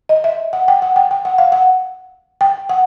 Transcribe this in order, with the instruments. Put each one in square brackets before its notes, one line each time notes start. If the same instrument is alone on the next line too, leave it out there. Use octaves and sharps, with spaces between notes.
[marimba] D#5
E5
F#5
G5
F#5
G5
G5
F#5
F5
F#5
G5
F#5